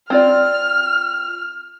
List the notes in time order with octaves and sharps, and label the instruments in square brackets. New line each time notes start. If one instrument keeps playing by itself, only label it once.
[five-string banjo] C4 F4 D5 [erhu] F6